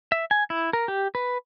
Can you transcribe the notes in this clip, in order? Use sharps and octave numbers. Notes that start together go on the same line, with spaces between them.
E5
G#5
E4
A#4
G4
B4